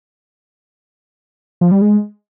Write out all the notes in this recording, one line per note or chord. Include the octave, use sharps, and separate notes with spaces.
F3
G3
G#3